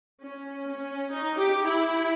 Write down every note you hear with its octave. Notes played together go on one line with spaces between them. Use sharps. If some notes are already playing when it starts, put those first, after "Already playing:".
C#4
C#4
D#4
G4
E4